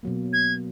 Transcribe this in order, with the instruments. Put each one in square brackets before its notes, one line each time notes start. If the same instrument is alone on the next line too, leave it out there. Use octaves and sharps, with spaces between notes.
[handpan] B2 F#3 A#3
[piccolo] G#6